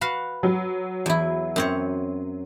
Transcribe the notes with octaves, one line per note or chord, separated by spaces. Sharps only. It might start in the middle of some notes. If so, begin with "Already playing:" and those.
F#4 B4 F5
F#3
E2 E4
F#2 C4 C#5